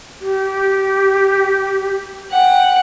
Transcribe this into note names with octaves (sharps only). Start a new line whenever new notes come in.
G4
F#5 G5